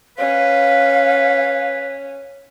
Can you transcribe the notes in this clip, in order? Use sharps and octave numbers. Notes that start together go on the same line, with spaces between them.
C#4 B4 F5